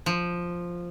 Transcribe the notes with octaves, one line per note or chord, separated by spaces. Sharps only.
F3